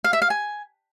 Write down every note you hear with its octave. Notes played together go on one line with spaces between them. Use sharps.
F5
E5
F5
G#5